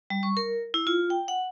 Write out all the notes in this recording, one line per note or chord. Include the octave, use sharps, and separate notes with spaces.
G3
C#6
A#4
E4
F4
G5
F#5